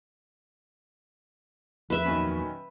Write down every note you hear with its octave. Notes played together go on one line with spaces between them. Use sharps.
E2 F3 B4 E5
A#2 D#3 F#3 B3 C#4